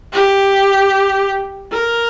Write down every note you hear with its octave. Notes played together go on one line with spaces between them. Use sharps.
G4
A#4